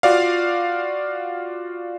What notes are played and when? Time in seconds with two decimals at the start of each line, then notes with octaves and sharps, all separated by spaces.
0.03 F4 F#4 D5 F5